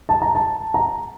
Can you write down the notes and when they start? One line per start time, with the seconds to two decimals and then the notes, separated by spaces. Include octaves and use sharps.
0.09 A5
0.22 A#5
0.35 A5
0.74 A#5